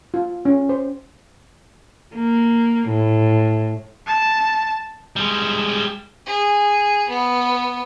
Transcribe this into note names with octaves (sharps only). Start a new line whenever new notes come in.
F4
C#4
C5
A#3
A2
A5
G3 G#3
G#4
B3